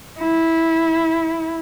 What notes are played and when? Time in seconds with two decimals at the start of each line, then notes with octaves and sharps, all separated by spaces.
0.19 E4